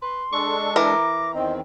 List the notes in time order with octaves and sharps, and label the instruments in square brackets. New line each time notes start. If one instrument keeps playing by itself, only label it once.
[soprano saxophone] B4 [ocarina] C6
[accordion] G#3 D4 A4 [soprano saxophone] C#6
[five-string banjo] E3 A#4 [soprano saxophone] A#5 [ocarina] D6
[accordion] E2 D#3 C4 [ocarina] D#5